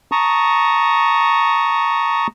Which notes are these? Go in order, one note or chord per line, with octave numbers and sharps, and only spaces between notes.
A5 A#5 C#6 D#6